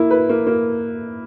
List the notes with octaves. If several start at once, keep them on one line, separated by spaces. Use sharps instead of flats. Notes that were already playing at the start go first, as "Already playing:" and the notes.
Already playing: A#3 E4
B4
A#3
A#3